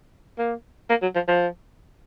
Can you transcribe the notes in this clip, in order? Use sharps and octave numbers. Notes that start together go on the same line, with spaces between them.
A#3
A#3
F#3
F3
F3